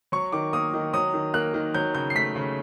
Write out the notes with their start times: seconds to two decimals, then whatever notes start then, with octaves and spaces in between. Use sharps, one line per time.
0.12 F#3 C#6
0.32 D#3 D6
0.53 A#3 D#6
0.74 D#3
0.94 F#3 D#6
1.14 D#3
1.34 A#3 F#6
1.54 D#3
1.74 F#3 G6
1.95 C#3 G6
2.10 C7
2.15 A3 B6
2.35 C#3